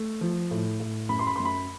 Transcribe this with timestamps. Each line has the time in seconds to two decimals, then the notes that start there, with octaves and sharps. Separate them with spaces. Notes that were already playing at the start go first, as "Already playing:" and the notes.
Already playing: A3
0.21 F3
0.51 A2
0.80 A2
1.09 F#2 B5
1.19 C6
1.27 B5
1.36 C6
1.40 F#2
1.45 B5